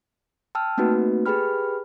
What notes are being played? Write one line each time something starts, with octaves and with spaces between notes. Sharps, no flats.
G5 A5 E6 F6
A3 A#3 C4 D#4 F#4 B4
G4 G#4 B4 G5 B5 F6